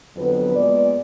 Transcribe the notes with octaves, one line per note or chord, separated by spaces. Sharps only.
F2 D3 F#3 B3 B4
A#2 G#3 B3 D5